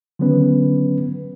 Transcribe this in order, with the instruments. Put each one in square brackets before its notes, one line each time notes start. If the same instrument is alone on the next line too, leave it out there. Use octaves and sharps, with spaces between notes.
[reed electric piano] D3 D#3 F#3 B3 C#4 B4